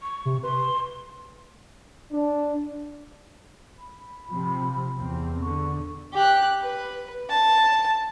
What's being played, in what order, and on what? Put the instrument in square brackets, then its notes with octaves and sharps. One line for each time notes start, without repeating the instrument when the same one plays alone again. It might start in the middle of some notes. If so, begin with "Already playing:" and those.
[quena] C#6
[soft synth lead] C3
[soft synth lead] B4 [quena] C6
[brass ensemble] D4
[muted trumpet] B5
[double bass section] C3 F3
E2 C4
[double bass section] D3 [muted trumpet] C#6
[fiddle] G4 F#6
B4
A5